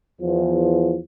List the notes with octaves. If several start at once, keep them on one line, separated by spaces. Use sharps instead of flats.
E2 F3